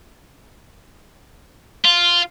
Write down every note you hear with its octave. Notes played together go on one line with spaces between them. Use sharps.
F4